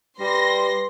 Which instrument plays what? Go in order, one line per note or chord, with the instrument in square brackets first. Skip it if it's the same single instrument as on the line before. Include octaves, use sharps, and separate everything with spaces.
[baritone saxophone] G3 [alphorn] B4 [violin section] C6 A#6